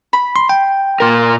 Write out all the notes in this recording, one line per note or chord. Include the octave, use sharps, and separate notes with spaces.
B5
C6
G5
A#2 A#4